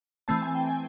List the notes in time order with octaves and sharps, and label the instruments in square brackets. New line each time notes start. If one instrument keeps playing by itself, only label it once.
[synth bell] E3 A3 C4 A5
G#5
G5
G#5